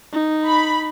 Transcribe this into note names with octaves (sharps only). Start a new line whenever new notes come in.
D#4
B5